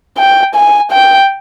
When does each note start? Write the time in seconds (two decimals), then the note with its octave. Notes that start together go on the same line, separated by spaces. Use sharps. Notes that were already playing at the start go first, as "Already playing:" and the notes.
0.17 G5
0.55 G#5
0.92 G5